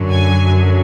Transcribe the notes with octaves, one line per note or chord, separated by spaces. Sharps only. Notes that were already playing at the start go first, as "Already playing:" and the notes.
Already playing: F#2 D3 F#3
G#5